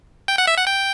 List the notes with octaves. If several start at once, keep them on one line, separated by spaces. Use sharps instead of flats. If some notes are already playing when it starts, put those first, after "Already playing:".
G5
F#5
E5
F#5
G5